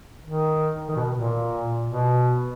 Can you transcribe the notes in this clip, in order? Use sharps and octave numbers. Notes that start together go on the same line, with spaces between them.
D#3
D#3
B2
A#2
B2